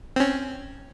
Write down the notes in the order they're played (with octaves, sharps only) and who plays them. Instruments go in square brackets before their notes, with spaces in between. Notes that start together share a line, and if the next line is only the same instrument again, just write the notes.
[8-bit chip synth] C4 C#4